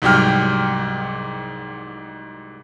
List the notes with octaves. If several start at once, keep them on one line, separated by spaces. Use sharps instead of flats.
C2 G#2 F#3 G3 G5 F6